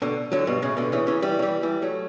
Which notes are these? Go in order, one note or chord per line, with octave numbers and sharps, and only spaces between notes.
B2 D3
D3 F#3
G2 B2
A2 C#3
B2 D3
C#3 E3
C#3 E3
E3 G3
F#3
E3 G3
E3 G3
F#3 A3